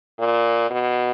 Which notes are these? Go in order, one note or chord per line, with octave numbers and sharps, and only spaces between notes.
A#2
B2